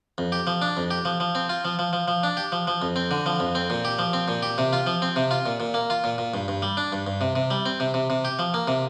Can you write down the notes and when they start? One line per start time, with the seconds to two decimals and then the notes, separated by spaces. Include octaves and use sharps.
0.18 F2
0.32 G4
0.47 F3
0.62 D4
0.77 F2
0.91 G4
1.05 F3
1.20 F3
1.35 C4
1.49 F4
1.65 F3
1.79 F3
1.93 F3
2.08 F3
2.23 D4
2.37 G4
2.52 F3
2.67 F3
2.82 F2
2.96 C4
3.11 D3
3.26 F3
3.40 F2
3.55 C4
3.70 A#2
3.85 G4
3.99 F3
4.13 C4
4.28 A#2
4.42 G4
4.58 C3
4.73 F4
4.87 F3
5.02 C4
5.16 C3
5.31 F4
5.46 A#2
5.60 A#2
5.74 A#3
5.90 F4
6.04 A#2
6.18 A#2
6.34 G2
6.48 G2
6.62 G3
6.77 D4
6.92 G2
7.07 G2
7.21 C3
7.36 C3
7.51 G3
7.66 C4
7.80 C3
7.94 C3
8.10 C3
8.25 G4
8.39 F3
8.54 A#3
8.68 C3